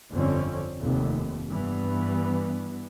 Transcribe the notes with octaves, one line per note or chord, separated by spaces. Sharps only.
G1 F2 D3 C4 C#4
F1 D#2
G2 E3 B3